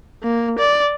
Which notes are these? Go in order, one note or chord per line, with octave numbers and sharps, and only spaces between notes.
A#3
D5